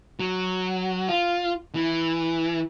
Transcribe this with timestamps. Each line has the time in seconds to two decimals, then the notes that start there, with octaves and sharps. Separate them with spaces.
0.20 F#3
1.09 F4
1.75 E3